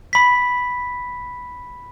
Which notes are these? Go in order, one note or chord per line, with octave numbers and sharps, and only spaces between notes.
B5 B6